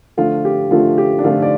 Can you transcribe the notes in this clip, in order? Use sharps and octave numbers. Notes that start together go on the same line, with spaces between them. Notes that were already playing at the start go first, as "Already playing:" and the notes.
D3 F3 A3 F4
G4
D3 F3 A3 F4
G4
D4
D3 F3 A3 F4
D5